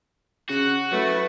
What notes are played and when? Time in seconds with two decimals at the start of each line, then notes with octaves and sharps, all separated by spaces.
0.49 C#3 F#4 F#6
0.91 F#3 A3 E4 B4